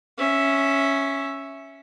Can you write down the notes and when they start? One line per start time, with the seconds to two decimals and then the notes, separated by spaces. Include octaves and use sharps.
0.18 C#4 E5